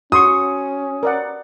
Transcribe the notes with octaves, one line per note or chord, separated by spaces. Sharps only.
C#4 F#4 C6 C#6 D#6
A#4 D5 F#5